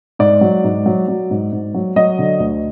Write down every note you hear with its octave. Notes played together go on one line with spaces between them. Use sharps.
G#2 D5
F#3
G#2
F#3
F#3
G#2
G#2
F#3
F#3 D#5
D3
D2